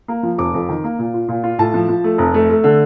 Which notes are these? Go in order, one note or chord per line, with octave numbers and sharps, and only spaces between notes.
A#3
F3
F1 D6
F2
D#3
A#3
A#2
F4
A#2
F4
A2 A5
F3
F3
A3
F1
A3
A3
D3